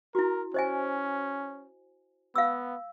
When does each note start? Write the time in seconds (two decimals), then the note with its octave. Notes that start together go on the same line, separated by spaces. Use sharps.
0.15 E4 F#4 A#4
0.54 C#4 C5 D#5 G#5
2.36 B3 F5 E6